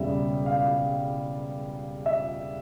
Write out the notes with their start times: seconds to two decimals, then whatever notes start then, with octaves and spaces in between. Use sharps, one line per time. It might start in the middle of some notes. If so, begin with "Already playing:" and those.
Already playing: E1 E2 C#3 G3 E5
0.46 F5
2.06 E5